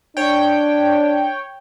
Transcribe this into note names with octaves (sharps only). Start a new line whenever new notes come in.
D4 C#5 G5